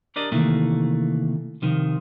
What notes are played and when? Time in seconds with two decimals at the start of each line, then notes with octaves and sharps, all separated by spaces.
0.16 D4 G4 A#4 D5 D#5
0.32 C3 D#3 E3 A3 A#3
1.62 C3 D#3 F3